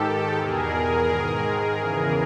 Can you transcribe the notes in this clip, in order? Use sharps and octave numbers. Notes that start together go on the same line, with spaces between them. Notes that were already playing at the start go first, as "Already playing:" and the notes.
Already playing: G#2 D#3 G4 A4
E2 B2 G#4 A#4
G#2 D#3
E2 C#3 E3